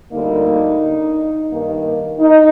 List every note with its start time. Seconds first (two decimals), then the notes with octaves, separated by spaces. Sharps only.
0.12 D2 D3 G3 A#3 D#4
1.51 G2 D#3 A#3
2.20 D#4